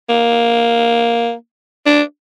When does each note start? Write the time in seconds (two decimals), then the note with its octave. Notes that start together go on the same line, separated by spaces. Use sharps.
0.09 A#3
1.86 D4